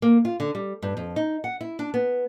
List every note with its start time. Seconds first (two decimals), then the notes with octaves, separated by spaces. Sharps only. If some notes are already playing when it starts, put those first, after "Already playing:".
0.02 A#3
0.25 F4
0.40 D3
0.55 G3
0.82 G2
0.97 F2
1.16 D#4
1.44 F#5
1.61 E4
1.79 D4
1.94 B3